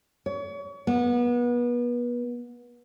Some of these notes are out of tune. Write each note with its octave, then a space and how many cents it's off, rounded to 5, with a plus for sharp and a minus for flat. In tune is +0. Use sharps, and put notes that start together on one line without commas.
C#5 +35
B3 -30